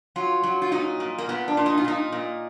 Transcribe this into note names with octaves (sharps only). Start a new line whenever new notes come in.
F#3 F4
F#3
F4
A#2 D#4
A#2
A#3
A#2 B3
D4
A#2
D#4
F4
A#2 D#4
A#2